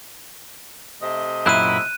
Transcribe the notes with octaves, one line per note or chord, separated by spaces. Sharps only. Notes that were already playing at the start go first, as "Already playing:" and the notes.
C3 A3 D#5
F#2 A#2 E4 F#6 D#7